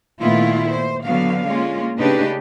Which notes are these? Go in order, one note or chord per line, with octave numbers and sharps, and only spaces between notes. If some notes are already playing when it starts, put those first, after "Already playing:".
A#2 D#3 A3 B3 E4 F4
C5
D3 F#3 B3 F5
G#3 A#3 C#4 F4
C#3 A3 D4 D#4 G4 B4